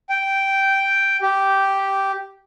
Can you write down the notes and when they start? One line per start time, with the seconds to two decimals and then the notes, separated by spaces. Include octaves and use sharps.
0.09 G5
1.22 G4